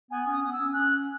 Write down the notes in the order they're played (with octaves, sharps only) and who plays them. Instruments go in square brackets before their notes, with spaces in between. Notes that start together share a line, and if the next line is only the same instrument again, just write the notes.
[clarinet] B3 [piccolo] G#5
[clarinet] C#4
[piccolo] D#6
[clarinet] B3 [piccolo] D#6
[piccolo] E6
[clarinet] C#4
[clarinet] C#4 [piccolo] F#6